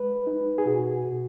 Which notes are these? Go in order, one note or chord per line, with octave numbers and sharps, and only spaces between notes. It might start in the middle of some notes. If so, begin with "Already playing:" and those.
Already playing: G#3 B4
D#4
G#4
B2 F#4
B2